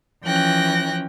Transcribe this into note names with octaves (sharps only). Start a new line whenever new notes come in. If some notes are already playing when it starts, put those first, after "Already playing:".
E3 F3 C#4 G5 F#6 A#6